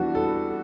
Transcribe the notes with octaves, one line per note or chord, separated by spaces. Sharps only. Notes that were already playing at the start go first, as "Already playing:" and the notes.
Already playing: E3 G3 B3 D4 F#4
A4